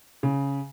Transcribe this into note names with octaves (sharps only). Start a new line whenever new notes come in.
C#3